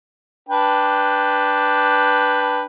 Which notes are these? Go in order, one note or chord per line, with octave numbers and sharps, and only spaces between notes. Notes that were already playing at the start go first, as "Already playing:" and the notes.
D4 B4 G5